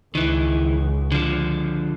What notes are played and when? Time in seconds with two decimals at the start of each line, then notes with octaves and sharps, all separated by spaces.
0.15 C#2 D#3 E3
1.12 D3 F3